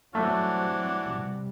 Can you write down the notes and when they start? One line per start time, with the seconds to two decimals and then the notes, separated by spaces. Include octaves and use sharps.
0.15 E3 F#3 G3 A3 C4 D4 F#4
1.09 C3 G3